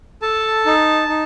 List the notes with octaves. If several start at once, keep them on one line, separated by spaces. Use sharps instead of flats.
A4 A5
D#4
D#4